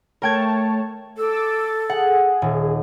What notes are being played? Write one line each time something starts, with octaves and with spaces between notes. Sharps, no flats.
A3 A#4 C#5 G5 A5 G#6
A4 D6 E6
G#4 F#5
D#1